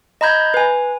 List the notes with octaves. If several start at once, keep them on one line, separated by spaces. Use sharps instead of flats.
D#5 A#5 B5 G6 G#6
B4 G#5